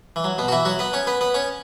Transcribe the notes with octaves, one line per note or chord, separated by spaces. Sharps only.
E3
F#3
B2 B3
F#4
E3 E4
F#3 F#4
B3 B4
C#4 C#5
B3 B4
B3 B4
C#4 C#5